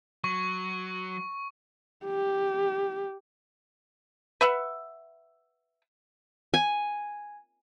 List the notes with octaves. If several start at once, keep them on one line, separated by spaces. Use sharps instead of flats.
F#3 C#6
G4
B4 E5 F#5
G#5